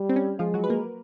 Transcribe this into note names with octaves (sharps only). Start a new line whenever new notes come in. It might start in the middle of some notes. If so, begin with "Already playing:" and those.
Already playing: G3
C4
C#4
F3 G#3 F4
F#3 F#4
B4
A#3 A#4